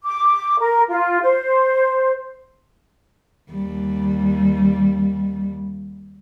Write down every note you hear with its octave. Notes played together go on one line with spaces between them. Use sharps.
D6
A#4
F4
C5
D#2 G3